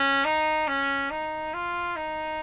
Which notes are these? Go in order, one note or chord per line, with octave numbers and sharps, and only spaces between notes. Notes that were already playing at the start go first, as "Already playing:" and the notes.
Already playing: C#4
D#4
C#4
D#4
F4
D#4